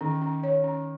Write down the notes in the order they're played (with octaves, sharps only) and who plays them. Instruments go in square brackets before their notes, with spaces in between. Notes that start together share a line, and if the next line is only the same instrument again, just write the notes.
[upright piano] D#3 [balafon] C#4
[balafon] C#4
C#5
C#4